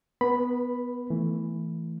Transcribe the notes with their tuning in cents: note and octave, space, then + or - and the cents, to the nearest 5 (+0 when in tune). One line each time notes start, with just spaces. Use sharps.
B3 +0 B4 -35 B5 +0
E3 +0 A3 +10